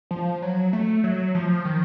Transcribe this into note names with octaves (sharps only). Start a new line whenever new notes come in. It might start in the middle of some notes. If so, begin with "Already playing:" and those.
F3
F#3
A3
F#3
F3
D#3